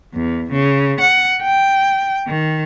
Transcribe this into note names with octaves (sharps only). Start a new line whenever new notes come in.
E2
C#3
F#5
G5
D#3